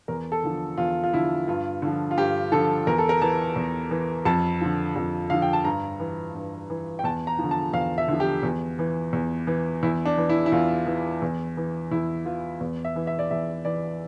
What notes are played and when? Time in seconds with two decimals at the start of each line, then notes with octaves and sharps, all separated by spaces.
0.08 E2 A#4
0.32 A4
0.44 D3 F3
0.78 E2 F4
1.04 F4
1.13 D3 F3 E4
1.48 G2 F4
1.82 D3 F3
2.11 F4
2.17 G2 G4
2.52 D3 F3 A4
2.87 E2 A#4
2.98 A4
3.09 A#4
3.22 E3 A5
3.56 E2
3.91 E3
4.25 F2 A5
4.61 D3 F3
4.96 F2
5.30 D3 F3 F5
5.42 G5
5.53 A5
5.65 G2 A#5
6.00 E3
6.35 G2
6.70 E3
6.99 G5
7.04 E2 A5
7.27 A#5
7.39 D3 F3
7.51 A5
7.73 E2 F5
7.98 E5
8.08 D3 F3
8.20 G4
8.43 E2
8.79 E3
9.13 E2
9.47 E3
9.83 E2 E4
10.05 D4
10.18 E3
10.29 E4
10.46 E4
10.52 E2 F4
10.87 E3
11.22 E2
11.57 E3
11.91 E2 E4
12.26 E3 F4
12.61 E2
12.85 E5
12.96 E3
13.07 E5
13.19 D5
13.31 E2 E5
13.65 E3 D5